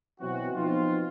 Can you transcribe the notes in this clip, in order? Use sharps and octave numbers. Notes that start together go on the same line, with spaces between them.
B2 E3 F#3 C4 F#4
F3 B3 C4 D#4 F4